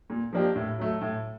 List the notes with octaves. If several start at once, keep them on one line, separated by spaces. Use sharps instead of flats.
A#2
F3 A#3 D4 G4
A2
F#3 A3
A2